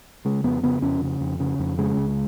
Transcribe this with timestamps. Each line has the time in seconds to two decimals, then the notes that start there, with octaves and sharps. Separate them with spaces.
0.25 C#3 G#3
0.44 F2 B3
0.63 C#3 B3
0.82 F2 C#4
1.02 C#3
1.21 F2
1.40 C#3
1.59 F2
1.78 C#3 G#3
1.97 C#2